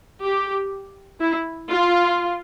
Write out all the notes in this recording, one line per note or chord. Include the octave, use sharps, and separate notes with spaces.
G4
E4
F4